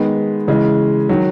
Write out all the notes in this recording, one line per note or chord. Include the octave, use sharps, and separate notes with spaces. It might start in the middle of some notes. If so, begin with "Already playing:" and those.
Already playing: D#3 G#3 B3
C#3 E3 G#3
D#3 F#3